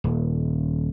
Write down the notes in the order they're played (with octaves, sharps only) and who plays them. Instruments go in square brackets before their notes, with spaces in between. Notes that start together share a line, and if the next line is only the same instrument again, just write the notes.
[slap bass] D#1